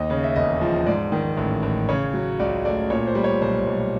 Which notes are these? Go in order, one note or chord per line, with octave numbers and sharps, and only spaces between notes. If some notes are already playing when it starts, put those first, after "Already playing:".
Already playing: D#2 D#5
C#3
E5
E1 D#5
F3
G#2 D5
D#3
A1
A1
C#3 C#5
F#3
C#2 D5
A3 D5
A#2 C#5
C5
G3
C#5
B1 C5
B1